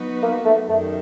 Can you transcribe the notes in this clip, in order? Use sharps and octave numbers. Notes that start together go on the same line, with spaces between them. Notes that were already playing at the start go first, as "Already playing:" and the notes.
Already playing: F#3 B3 D#4 F#4 B4
A#3
A3
F#2 D#3 G3 A3